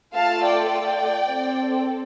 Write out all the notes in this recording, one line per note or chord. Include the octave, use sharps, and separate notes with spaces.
A3 F4 A4 F5 A5
D5 G5
D5 G5
C4 A4